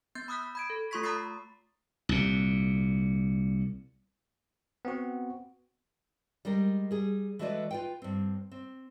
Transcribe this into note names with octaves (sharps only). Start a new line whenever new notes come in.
B3 G6 A6
B5 D#6 E6 F#6 G6 B6
B5 G#6 D7
A4
A3 F4 C6 C#6 G#6 B6
A#5 B5 D#6 E6 A6 C7
C2 A#2
B3 C4 F#4
G3 G#3 G4 A#4
G3 G#4
E3 G#3 A3 F#4 B4 D5
F4 B4 G5
G2 C4
C4